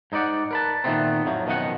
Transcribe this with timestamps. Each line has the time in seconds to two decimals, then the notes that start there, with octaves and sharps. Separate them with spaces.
0.12 G#2 D#4 F#4 D5 F#5
0.51 A#4 B4 A5
0.84 A#2 D#3 E3 A3 B3 C4
1.26 F2 A2 F3 F#3
1.46 F#2 B2 D#3 F3 D#5 F#5